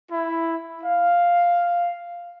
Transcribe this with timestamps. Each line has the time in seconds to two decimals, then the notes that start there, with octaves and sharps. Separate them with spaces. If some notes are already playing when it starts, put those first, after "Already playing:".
0.12 E4
0.84 F5